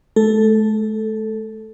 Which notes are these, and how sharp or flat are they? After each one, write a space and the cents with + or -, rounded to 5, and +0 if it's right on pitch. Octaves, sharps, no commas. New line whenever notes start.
A3 -40 A4 +0